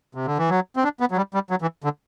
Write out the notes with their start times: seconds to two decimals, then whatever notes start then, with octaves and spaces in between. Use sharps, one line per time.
0.15 C3
0.26 D3
0.38 E3
0.50 F#3
0.76 C4
0.84 D4
1.00 B3
1.11 F#3
1.17 G3
1.34 G3
1.50 F#3
1.62 E3
1.84 D3